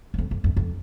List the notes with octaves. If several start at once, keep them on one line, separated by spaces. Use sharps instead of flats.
E2
F2
F2
F2
F2